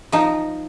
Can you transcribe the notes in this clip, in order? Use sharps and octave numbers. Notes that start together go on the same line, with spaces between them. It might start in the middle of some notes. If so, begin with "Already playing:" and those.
F3 D#4